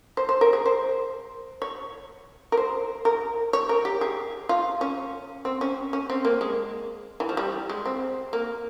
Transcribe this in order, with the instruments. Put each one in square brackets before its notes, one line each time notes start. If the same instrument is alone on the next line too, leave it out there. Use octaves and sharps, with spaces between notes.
[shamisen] C5
C5
A#4
G#4
C5
C#5
A#4
C5
A#4
C#5
A#4
G4
G#4
F4
C#4
C4
C#4
C#4
C4
A#3
G#3
E3
F3
G3
G#3
C4
A#3